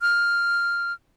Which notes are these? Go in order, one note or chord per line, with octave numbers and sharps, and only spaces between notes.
F6